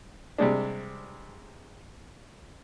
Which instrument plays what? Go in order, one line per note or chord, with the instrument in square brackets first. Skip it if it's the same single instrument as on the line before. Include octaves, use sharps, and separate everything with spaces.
[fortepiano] C3 G3 G#3 D4